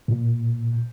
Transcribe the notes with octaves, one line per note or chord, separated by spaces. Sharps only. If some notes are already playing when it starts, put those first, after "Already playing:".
A#2